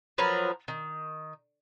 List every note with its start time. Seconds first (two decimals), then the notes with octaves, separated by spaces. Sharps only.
0.18 F3 F#3 A#4 B4
0.68 D#3